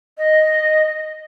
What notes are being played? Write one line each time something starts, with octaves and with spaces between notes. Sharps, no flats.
D#5